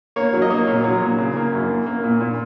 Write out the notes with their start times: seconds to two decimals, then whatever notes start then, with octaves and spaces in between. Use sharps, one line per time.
0.16 A#3 C#5
0.33 F#3
0.42 D#5
0.50 A#3
0.67 A#2 C#5
0.84 F#3
1.01 A#2
1.18 C#3
1.36 A#3
1.53 F#2
1.69 A#3
1.86 A#3
2.03 A#2
2.20 A#2